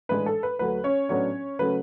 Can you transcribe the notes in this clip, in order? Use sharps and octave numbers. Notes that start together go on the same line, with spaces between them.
A2 E3 G#3 D4 B4
A4
B4
D2 D3 F#3 A3 B4
C#4 C#5
A2 F#3 B3 C#4 D4 C#5
C#3 F#3 A3 C#4 B4